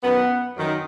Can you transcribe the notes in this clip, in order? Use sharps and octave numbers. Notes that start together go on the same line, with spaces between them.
F#2 D#3 B3
F#2 D#3